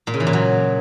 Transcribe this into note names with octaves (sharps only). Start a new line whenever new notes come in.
A#2
C#3
E3
A#2
F#3